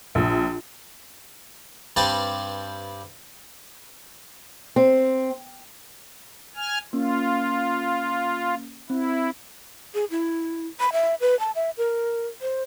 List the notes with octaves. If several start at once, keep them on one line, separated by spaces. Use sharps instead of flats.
A#1
G2 G3 C4 B4 C5 A5
C4
G#5 F6
A#3 C#4 F4
C4 E4
G#4
E4
B5
E5
B4
A5
E5
A#4
C5